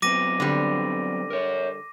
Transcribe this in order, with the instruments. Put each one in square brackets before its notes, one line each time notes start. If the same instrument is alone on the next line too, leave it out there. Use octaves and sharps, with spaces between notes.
[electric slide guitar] F#3 B3 C4 [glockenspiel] D6 A#6 D#7
[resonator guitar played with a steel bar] D3 G3
[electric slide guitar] A#4 C#5